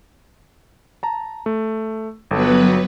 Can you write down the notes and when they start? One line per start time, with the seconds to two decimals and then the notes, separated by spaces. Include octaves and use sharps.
1.03 A5 A#5
1.46 A3
2.31 G1 F#3 B3 A4 B4